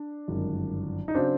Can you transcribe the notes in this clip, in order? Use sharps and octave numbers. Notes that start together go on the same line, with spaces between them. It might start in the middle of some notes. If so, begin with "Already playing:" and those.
Already playing: D4
G1 F#2 D#3 G#3
D#4
C#3 F#3 C4 D4